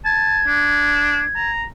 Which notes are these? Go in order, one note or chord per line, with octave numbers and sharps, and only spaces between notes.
A5 G#6
D4
A#5